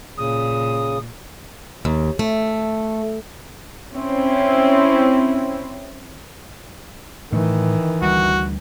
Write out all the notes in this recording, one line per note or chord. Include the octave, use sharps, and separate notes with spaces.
A#2 C#3 D#6
D#2
A3
C4 C#4 E4
A2 D#3 E3 A3
D2 G3 F#4